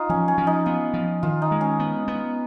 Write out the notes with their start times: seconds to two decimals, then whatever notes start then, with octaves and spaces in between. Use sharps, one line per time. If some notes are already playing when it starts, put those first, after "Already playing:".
Already playing: D#4 F4
0.09 F3 C#4
0.28 C#4
0.38 F3
0.47 D#4
0.66 B3 F4
0.94 F3
1.23 D#3 F4
1.42 D#4
1.51 G#3
1.61 C#4
1.80 B3
2.08 B3